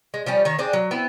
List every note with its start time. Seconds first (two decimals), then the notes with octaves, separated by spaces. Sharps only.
0.14 G#3
0.26 F3 G3 C#4
0.45 D#3 C#5
0.59 C4 D4 G#4
0.73 F#3
0.91 B3 C4 E4